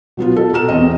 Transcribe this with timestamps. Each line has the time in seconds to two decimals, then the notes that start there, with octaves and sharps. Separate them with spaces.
0.17 B2 F#3 B3 F4
0.36 A4
0.53 B2 A#5 F6 E7
0.68 E2 C4 D#5